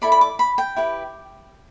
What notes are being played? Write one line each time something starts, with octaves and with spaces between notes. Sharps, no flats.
E4 A4 D5 B5
B5
D6
B5
G5
E4 G4 B4